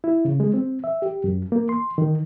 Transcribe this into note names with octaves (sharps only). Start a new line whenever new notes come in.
E4
C#3
G#3
C4
E5
G4
F#2
A#3
C6
D#3